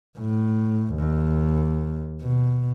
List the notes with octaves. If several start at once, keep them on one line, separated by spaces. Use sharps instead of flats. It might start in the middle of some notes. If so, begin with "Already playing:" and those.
A2
D#2
B2